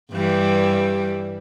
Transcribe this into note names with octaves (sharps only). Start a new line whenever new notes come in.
G2 E3 G3